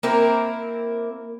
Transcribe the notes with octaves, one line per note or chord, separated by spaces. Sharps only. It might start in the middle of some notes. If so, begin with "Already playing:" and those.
A#3 C4 E4 A#4